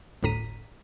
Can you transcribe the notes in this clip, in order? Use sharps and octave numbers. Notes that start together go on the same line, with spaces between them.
G1 D2 A2 A#5 B6 D#7